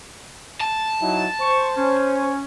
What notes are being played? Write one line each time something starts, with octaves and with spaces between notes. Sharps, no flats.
A5
F#3 D#4 E4
C5 C#6
C#4